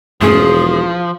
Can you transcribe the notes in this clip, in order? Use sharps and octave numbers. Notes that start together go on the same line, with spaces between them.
E1 G2 F3 A3 C#4 G#4